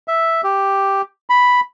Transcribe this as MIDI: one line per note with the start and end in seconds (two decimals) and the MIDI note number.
0.08 0.41 76
0.44 1.02 67
1.30 1.61 83